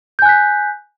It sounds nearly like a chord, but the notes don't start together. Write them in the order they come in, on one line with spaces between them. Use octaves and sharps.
G6 G#5 F#6 B6